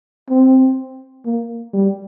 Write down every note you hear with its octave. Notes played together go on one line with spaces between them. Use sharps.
C4
A#3
G3